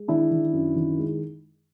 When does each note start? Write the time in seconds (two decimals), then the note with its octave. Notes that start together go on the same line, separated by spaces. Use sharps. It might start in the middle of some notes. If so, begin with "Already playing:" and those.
Already playing: G#3
0.08 D#3 D4 E4
0.31 D#3
0.53 F#2
0.76 D#3
0.99 G#3